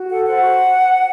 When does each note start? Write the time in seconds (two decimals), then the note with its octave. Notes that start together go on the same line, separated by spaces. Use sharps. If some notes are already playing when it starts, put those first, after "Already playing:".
Already playing: F#4
0.09 A4 F#5
0.25 C5 F#5
0.41 F#4